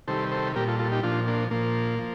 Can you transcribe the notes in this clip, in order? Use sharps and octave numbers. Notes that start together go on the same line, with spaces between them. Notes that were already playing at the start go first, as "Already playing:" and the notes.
C3 D#3 G3 A4 C5
A4 C5
A#2 G3 G4 A#4
F4 A4
F4 A4
D#4 G4
A#2 F3 D4 F4
A#3 D4
A#2 F3 A#3
F3